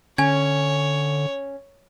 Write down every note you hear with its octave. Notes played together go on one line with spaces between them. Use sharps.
D3 C#4 C#5 G#5 G#6